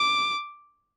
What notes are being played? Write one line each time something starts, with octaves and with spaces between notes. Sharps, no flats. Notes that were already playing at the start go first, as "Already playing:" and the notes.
Already playing: D6